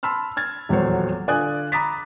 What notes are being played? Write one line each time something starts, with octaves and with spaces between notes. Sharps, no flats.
A5 B5 C6 E6 F6
F6 G#6 A6
D#1 E2 F#3 F#4 C5 C#5
D3 F4 D5 G#5 D#6 F#6
A#5 B5 D6 D#6 A6 B6